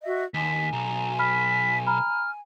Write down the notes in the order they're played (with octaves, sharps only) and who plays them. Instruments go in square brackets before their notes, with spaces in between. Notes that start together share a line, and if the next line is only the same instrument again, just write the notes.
[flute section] F#4 D#5 E5
[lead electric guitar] D#2 [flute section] G#5 [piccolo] B6
[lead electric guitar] B1 [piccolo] A#5
[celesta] B5 F6 [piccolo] B6
[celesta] A#5 B5 [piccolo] F6